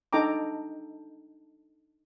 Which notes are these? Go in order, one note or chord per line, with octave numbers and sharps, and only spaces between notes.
D4 D#4 A4 G5 A#5 D6